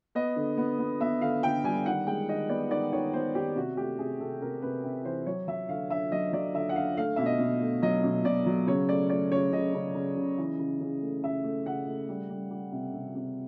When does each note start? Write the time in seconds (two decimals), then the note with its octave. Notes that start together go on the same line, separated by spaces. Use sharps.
0.15 B3 D#5
0.36 D3
0.57 B3
0.79 B3
1.00 B3 E5
1.21 D3 F5
1.43 D3 G5
1.64 G3 G#5
1.86 D#3 F#5
2.07 G#3 G5
2.29 D#3 D#5
2.49 B3 D5
2.71 D#3 D5
2.92 D#3 C#5
3.13 B3 C5
3.35 D#3 G4
3.56 C3 F#4
3.77 A3 G4
3.98 C3 G#4
4.20 C3 A4
4.41 C3 A#4
4.62 C3 B4
4.84 C3
5.05 E3 C5
5.26 F#3 C#5
5.48 F#3 E5
5.69 D3 F5
5.90 D3 E5
6.12 F#3 D#5
6.33 F#3 D5
6.54 D3 E5
6.69 F#5
6.76 D3 F5
6.97 A3 F5
7.16 B2 E5
7.26 D#5
7.40 B2
7.61 A3
7.82 F#3 D#5
8.04 B2
8.25 B2 D5
8.46 F#3
8.67 C#3 C#5
8.89 A3 D5
9.10 A3 D5
9.31 C#3 C#5
9.53 C#3 D#5
9.74 C#3
9.95 C#3
10.17 C#3
10.38 E3
10.59 C#3
10.81 C#3
11.02 A3
11.23 C#3 E5
11.44 A3
11.66 C#3 F#5
11.88 A3
12.09 G3
12.30 G3
12.51 G3
12.72 C3
12.93 C3
13.15 C3